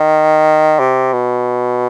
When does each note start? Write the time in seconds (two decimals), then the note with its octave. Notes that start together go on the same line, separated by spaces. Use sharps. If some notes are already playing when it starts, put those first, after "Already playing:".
Already playing: D#3
0.80 C3
1.13 B2